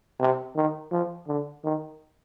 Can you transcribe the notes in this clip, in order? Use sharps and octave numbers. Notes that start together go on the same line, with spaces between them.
C3
D#3
F3
D3
D#3